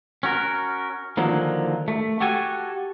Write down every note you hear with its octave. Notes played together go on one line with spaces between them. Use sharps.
C#4 F#4 A#4
D3 D#3 F3 F#3 A#3
A3
F#4 G4 A4 F#5 G#5